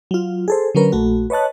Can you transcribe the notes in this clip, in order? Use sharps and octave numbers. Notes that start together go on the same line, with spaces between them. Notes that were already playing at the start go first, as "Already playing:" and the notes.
F#3 F4
G#4 A4 C5
D3 F#3 C#4 A#4 B4
A#1 A3 F#4
B4 C#5 D#5 A5 F#6